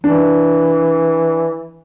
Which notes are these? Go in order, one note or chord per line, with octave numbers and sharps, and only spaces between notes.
E3 D4